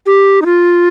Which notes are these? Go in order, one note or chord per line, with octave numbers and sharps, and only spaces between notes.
G4
D#4
F4